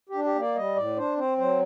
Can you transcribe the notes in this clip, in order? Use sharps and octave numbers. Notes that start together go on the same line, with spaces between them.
G4
D4
G4
A#3 D5
G3 D#5
A2 D5
D4 C5
C4 C5
F#3 C5